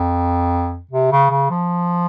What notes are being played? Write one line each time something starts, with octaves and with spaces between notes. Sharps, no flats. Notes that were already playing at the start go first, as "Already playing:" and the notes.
Already playing: F2
C3
C#3
C#3
F3